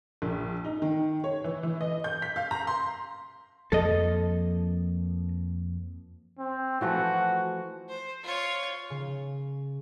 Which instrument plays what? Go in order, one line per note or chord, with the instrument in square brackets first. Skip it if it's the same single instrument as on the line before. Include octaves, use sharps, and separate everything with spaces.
[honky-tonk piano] A#1
D#4
D#3
C#5
E3
E3
D#5
G6
B6
F5
A#5
C6
[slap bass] F2 F3 A#3 [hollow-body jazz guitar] A4 D#5
[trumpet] C4
[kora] E3 F3 A3 [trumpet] F#4
[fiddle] C5
F4 C#5
[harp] C#3